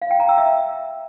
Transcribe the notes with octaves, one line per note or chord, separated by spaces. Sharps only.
F5
G5
A#5
E6
E5